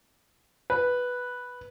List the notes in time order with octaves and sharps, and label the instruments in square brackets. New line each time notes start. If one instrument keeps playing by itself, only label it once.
[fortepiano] B4